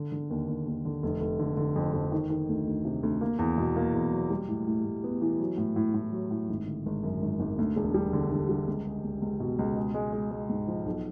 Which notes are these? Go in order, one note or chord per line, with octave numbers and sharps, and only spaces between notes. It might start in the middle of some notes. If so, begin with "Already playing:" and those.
Already playing: D3
D3
D#2
D#2
D#2
D3
F1
F1
D3
D3
F2
F2
D#3
D#3
D2
D2
C3
D2
A#3
E2
B2
A#3
E2
F#3
G3
A2
A2
A2
B3
E3
F#3
A2
A2
A2
F#3
A2
G#1
D3
G#1
F#2
G#1
G#1
D2
E1
G3
D3
D3
G3
C#2
G#3
C#2
C#2
B2
C#2
G#3
G#3
G#3
G#3
G#2
F3
B1